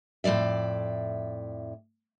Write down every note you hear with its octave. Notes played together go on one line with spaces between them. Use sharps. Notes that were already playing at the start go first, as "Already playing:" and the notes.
F2 A2 A#3 D5 E5